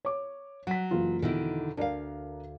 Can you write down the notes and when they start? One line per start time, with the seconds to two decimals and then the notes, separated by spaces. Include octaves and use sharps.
0.05 C#5 D6
0.67 F#3 F#5 B6
0.91 F#1 E3 F4
1.22 E2 B2 D3 D#3 E4
1.77 D2 D4 A#4 D5 F5